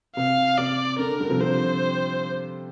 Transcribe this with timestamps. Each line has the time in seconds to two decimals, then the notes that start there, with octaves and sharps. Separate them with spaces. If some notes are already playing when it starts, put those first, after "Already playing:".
0.16 C3 F5
0.57 C3 D5
0.98 D3 A#4
1.20 D3 G3
1.30 C3 F3
1.40 C3 F3 C5